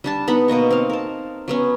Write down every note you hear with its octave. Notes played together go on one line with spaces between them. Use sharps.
G3 D4 A5
B3 D#4 F#5 B5
B2 A#3 D#5 C#6
C4 F5
A#4 A5
F#3 B3 C#4